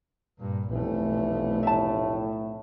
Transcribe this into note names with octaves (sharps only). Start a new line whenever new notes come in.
G2 A#2
F1 B1 E3 A3
A2 E5 A5